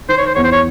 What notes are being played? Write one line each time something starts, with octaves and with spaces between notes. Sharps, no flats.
D#3 C5
C#5
C5
E2 C#5
C5
C#5